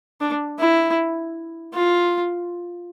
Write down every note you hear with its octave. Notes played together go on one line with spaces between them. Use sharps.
D4
E4
F4